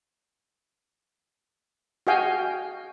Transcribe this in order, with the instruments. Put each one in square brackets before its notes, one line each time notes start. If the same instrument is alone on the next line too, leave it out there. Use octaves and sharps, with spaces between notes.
[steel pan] F#4 G#4 D#5 F5 G5 G#5